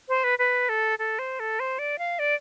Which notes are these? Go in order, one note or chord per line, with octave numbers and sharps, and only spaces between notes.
C5
B4
B4
A4
A4
C5
A4
C5
D5
F5
D5